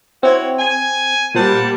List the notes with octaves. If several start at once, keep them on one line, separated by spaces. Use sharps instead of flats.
C4 E4 F#4 C#5
G#5
A#2 G3 A#3 C5 F#5 A5